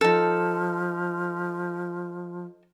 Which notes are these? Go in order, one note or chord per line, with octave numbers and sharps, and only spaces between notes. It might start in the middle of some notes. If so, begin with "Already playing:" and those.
F3 D#4 A4